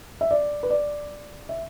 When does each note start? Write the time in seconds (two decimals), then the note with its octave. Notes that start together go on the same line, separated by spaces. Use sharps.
0.21 E5
0.31 D5
0.63 B4
0.70 D5
1.49 E5